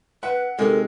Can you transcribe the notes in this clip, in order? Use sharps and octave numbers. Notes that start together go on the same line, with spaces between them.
B4 E5 F#5
C3 G#3 C4 D#4 A4 A#4